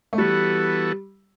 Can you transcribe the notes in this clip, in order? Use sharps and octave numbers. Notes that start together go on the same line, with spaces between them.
A3
E3 G3 B3 F#4 A4